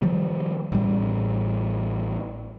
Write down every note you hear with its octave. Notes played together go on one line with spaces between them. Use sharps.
D#3 F3 G3
A1 A2 G3